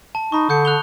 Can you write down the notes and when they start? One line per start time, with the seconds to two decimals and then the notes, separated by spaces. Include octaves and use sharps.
0.15 A5
0.32 D#4 A5 B5 C#6
0.49 D3 D#6 G6 C#7
0.65 F#6 F7 G7